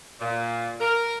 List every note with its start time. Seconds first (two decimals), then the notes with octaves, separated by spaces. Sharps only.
0.20 A#2
0.80 A#4